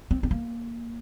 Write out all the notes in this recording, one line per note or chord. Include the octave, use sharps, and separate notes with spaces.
C4
C4
A#3